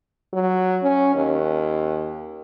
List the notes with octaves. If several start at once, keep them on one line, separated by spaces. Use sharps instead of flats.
F#3
C#4
D#2